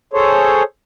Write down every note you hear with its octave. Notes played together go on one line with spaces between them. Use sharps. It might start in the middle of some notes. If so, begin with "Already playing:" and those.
G#4 A4 C5 C#5